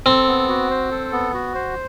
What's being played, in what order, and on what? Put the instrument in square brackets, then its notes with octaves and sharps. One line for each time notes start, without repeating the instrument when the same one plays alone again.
[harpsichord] C4 [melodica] A4
[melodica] B3
F#4
C5
A4
B3
F#4
C5